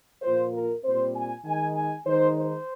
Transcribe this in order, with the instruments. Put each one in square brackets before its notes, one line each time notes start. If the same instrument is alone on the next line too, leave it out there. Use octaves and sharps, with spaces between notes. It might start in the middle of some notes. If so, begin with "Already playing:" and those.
[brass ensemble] A#2 F3 A#3 F4 C5
A#4
A#2 G3 C4 C5
G#5
D#3 G#3 D#4 G#5
G#5
D#3 G#3 D#4 C5
C5